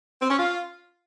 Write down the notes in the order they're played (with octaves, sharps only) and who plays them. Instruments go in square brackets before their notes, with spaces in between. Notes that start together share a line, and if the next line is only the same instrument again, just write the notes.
[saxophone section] C4
C#4
F4